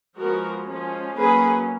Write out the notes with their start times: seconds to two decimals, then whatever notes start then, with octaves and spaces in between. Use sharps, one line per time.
0.17 F3 G#3 B3 F#4 A#4
0.67 F3 G#3 C#4
1.17 F#3 A#3 C#4 G#4 B4